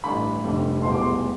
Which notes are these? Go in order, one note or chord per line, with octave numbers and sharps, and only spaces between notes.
A1 G2 D3 B5
F1 F2 D3 G3
E1 E2 B2 G3 C6
D6
C6
G3